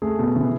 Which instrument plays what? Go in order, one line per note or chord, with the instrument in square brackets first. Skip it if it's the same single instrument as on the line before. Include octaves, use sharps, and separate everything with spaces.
[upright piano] A3 G#4
B2
E3